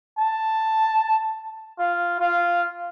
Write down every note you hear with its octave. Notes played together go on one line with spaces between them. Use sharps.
A5
F4
F4